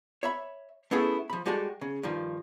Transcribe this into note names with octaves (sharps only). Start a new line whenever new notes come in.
C#5 E5 B5
A3 B3 C#4 E4 G#4 A4
F3 B5
G3 G#3 F#4 G4 A4
C#3
G2 D#3 F3